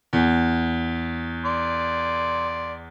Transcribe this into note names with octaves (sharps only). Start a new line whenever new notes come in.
E2
D5 C6